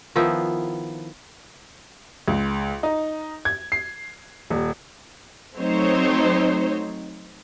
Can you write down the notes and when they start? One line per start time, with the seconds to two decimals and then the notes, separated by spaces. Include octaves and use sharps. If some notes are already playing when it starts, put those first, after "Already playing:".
0.16 D#3 F3 B3 E4
2.28 C#2
2.83 D#4
3.45 G#6
3.72 C7
4.50 D#1
5.57 F#3 A3 C4 D#4 C5 C#5